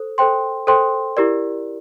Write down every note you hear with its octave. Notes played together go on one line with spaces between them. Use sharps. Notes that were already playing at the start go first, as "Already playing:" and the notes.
Already playing: A4 C5
A4 C5 G5 C6
A4 C5 G5 C6
E4 G4 A#4 D5